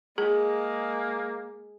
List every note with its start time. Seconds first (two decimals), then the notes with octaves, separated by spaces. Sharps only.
0.18 G#3 A#3 G#4